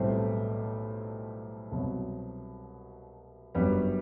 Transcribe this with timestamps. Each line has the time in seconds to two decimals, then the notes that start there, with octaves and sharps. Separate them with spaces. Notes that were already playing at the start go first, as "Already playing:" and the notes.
Already playing: B1 A2 E3 G3 A3 C4
1.71 C2 B2 F#3
3.55 G1 F#2 F#3 G3 B3